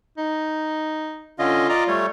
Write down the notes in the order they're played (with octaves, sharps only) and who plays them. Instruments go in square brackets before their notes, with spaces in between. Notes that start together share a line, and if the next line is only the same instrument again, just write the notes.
[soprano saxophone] D#4
[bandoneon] D3 C#4 D#5 [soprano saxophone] F4
[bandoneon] D5 D#5 A#5
G3 A3 C#5